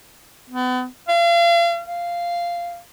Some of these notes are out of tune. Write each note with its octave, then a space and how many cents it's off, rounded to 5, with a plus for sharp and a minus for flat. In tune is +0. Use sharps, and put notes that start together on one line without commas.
B3 +35
F5 -35
F5 -10